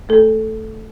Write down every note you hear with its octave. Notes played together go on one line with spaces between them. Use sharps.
A3 A4